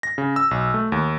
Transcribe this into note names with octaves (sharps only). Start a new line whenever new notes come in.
A#6
C#3
E6
B1
A3
D#2